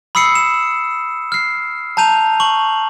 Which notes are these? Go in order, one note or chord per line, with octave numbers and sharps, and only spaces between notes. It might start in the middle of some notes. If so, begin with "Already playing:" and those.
B5 D#6 E6 C7 C#7
E7
F6 C7
A5 A#5 G6 D#7 F7
C#6 F#7